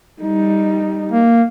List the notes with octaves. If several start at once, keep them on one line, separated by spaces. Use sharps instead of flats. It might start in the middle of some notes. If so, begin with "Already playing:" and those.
G3 D#4
A#3